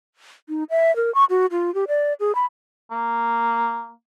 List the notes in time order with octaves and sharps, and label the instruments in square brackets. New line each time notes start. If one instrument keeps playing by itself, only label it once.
[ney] D#4
E5
A#4
C#6
F#4
F4
G4
D5
G#4
B5
[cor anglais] A#3